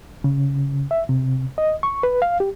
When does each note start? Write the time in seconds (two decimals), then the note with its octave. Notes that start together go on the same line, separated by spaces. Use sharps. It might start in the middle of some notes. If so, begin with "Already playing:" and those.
0.24 C#3
0.91 E5
1.09 C3
1.58 D#5
1.83 C#6
2.03 B4
2.22 F5
2.40 G4